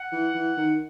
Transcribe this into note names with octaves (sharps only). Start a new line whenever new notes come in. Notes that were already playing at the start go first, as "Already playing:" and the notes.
Already playing: F#5
E3
E3
D#3